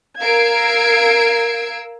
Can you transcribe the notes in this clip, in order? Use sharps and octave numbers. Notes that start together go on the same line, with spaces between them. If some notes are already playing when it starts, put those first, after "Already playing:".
A#4 F5 E6 G#6 C7 D7